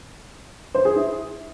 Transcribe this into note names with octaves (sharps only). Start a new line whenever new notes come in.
C5
G#4
E4